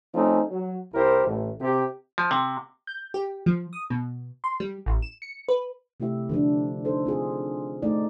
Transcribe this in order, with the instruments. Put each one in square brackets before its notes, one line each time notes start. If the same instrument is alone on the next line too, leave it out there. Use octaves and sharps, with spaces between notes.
[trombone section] F3 A3 C4 C#4 D#4
F#3
C2 E4 G4 A#4 C5
A1
C3 C4 G4
[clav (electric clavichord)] F3
C3
[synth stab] G6
G4
F3
D#6
B2
C6
G3
A1
E7
C#7
B4
[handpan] C3 A3 E4 G4 E5
D3 F3 D4
D#4 A4 C5
C4 F4 G#4
A3 D#4 D5